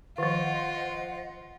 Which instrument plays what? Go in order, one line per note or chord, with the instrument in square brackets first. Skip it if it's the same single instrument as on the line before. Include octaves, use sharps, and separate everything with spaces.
[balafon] D#3 F3 [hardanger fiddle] F4 [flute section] C5 D#5 F#5